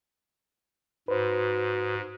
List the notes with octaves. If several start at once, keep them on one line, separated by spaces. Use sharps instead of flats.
G#2 F#4 B4 C5